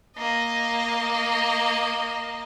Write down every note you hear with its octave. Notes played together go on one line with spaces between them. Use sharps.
A#3 D#5